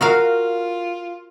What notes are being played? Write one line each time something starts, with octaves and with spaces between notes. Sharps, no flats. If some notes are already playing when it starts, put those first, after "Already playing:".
F4 F#4 A#4 F5